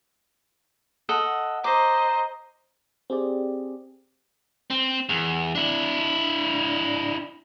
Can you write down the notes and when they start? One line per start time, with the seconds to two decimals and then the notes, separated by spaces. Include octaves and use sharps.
1.09 A4 D#5 F#5
1.64 C5 D#5 A#5 D6
3.10 C4 G4 G#4 D5
4.70 C4
5.09 E2
5.55 D4 E4